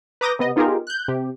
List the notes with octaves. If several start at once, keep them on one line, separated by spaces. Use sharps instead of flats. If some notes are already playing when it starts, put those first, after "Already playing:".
B4 A#5 D6 D#6 G6 A#6
C3 B3 D#5
B3 D#4 F4 G4 G#4 A#4
F#6 G6
C3 G4